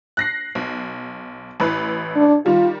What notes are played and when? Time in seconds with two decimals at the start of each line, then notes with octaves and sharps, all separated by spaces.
0.17 F#6 A#6 C7
0.55 B1
1.60 A1 E4 B4
2.16 D4
2.46 D#3 G3 F4